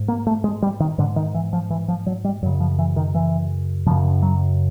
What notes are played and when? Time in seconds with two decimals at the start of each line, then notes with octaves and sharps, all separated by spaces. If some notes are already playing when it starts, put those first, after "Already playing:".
Already playing: G#2
0.08 A#3
0.27 A3
0.44 G#3
0.62 G3
0.80 D#3
0.98 G#2 D3
1.16 D#3
1.34 E3
1.53 F3
1.70 E3
1.88 F3
2.06 F#3
2.24 G3
2.42 F#2 F#3
2.46 C#3
2.60 F3
2.79 E3
2.96 D#3
3.15 E3
3.87 F#2 C#3 F3
4.22 F#3